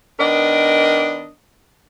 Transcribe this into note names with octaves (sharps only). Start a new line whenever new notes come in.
D#3 B3 D4 A#4 D#5